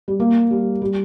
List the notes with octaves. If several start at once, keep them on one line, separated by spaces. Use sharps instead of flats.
G3
A#3
G3
G3